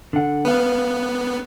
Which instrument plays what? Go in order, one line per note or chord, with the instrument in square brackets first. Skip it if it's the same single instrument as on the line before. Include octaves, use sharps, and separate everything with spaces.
[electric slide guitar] D3 F#5
[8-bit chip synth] B3 [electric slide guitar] B4 F5